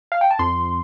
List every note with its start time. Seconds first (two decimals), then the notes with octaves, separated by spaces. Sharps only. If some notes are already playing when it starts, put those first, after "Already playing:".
0.12 F5
0.21 G5
0.31 A5
0.39 F2 C6